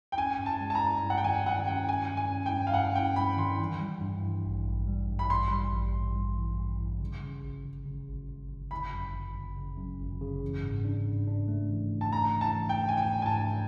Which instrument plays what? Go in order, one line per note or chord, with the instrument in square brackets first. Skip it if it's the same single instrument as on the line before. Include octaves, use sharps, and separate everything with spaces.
[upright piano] G5
[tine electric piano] C#4 [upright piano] G#5
[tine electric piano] G2
[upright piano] A5
[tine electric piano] G#3
[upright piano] A5
A#5
[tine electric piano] G2
G2
[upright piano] F#5
G5
[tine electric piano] D#3 [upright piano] G#5
[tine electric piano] G2 [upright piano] F#5
[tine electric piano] C#4 [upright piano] G5
[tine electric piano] G2 [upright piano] G#5
[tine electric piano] G2
[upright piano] G#5
[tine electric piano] C#4
[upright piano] G5
[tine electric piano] G2
[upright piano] F5
[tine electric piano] G2 [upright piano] F#5
[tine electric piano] C#4 [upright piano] G5
[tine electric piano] G2 [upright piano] B5
[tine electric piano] D#3 [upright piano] C6
[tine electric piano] E3
G3
G2
E3
A1
A1
G3
G2
[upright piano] B5
[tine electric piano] A1 [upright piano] C6
[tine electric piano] G3
A1
G2
G3
E3
G2
E3
C#3
C#3
G1
C#3
C#3
G1
G1
G1
[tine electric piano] G1 [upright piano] B5
[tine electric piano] F#2
G1
G1
C#3
F#2
G1
C#3
E3
G#2
D4
G#2
D4
A3
E3
E3
[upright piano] A5
[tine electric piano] A3 [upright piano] A#5
[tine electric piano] E3
[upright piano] A5
[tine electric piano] E3
[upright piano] G5
[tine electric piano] A3
[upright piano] G#5
[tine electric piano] G#2 [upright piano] G5
[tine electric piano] G#2 [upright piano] G#5
[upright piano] A5
[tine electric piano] D4